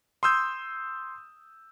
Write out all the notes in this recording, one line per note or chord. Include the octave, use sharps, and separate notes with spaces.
C6 D#6 E6 G6